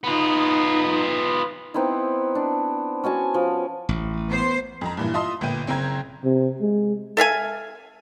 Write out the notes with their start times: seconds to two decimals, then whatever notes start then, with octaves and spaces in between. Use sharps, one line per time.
0.04 B3 D#4 F4
1.74 B3 C4 D#4 E4
2.35 D4
3.04 C#4 F#4 G#5 A5
3.34 F3
3.89 A1
4.29 B3 C5
4.81 F2 A#5
4.97 G2 A#2 E3
5.14 F4 D#5 E5 A5 C6 D#6
5.41 G1 A#2 B4 G5 D#7
5.67 F#1 C4 G5 A#5 G#6
6.24 C3
6.61 G#3
7.17 A4 E5 F5 G#5